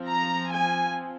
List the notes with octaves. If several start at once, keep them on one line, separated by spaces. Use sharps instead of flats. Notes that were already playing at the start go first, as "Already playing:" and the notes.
Already playing: F3 C4
A#5
G#5